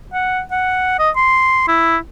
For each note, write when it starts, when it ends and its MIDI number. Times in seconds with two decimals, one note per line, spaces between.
0.13 0.41 78
0.51 0.96 78
0.99 1.10 75
1.16 1.64 84
1.68 1.97 64